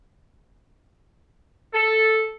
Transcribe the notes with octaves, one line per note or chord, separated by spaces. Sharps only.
A4